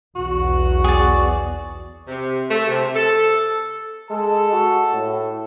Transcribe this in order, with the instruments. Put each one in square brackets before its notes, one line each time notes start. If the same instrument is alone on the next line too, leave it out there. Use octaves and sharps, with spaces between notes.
[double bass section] B1 E2 [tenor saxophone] F#4
[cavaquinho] G#4 D5
[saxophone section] C3
A3
C3
A4
[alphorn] G#3 [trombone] A4
[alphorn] F#4
A2